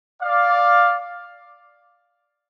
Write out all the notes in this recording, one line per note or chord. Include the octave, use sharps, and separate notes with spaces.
D5 F5